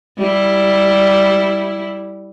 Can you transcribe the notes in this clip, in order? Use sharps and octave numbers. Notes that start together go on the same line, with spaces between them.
G3 E4